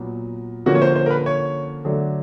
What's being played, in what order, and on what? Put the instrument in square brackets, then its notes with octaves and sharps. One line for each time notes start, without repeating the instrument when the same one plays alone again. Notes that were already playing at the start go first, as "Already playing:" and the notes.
Already playing: [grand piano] A#2 F#3 B3
D3 F3 A#3 C#4 F#4
C#5
C5
C5
A#4
B4
C#5
D3 F#3 A3 D4